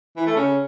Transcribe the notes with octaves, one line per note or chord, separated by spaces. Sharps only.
E3
A3
C#3